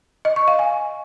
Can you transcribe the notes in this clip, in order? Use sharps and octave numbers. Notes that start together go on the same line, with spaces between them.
D#5
C#6
F5
G#5